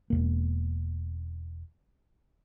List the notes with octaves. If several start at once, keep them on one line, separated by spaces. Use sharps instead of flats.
E1 F2 A#3